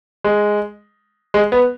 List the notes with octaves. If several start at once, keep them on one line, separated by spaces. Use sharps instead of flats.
G#3
G#3
B3